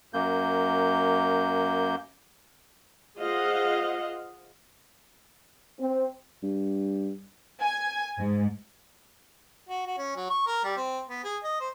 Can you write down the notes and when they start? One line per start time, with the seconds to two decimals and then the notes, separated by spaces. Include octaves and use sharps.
0.14 F#2 A#3 G6
3.18 F4 G#4 C5 D#5 F5 F#5
5.79 C4
6.43 G2
7.62 G#5
8.18 G#2
9.69 F#4
9.86 F#4
9.98 C#4
10.16 F#3
10.30 C#6
10.47 A#4
10.65 G3
10.77 C4
11.09 B3
11.24 G#4
11.44 D#5
11.61 C5